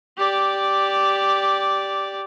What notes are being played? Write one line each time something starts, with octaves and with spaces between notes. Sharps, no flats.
G4 D5